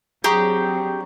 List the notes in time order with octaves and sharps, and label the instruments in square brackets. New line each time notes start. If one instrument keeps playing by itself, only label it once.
[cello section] F#3 C4 D4 [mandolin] G4 [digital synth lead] G#4 [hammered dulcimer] A#5 C#6